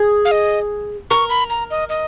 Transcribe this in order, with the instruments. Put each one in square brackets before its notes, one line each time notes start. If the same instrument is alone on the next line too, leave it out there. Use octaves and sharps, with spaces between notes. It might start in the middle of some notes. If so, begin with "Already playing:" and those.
Already playing: [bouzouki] G#4
[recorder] F5
D#5
[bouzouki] A#4 [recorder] C#6
[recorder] B5
A#5
D#5
D#5